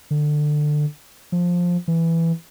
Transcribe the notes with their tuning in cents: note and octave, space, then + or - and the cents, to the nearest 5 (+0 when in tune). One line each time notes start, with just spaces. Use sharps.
D3 +20
F3 +10
E3 +5